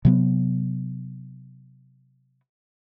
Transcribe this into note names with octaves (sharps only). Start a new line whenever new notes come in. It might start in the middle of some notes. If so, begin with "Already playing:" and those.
C3 F#3 B3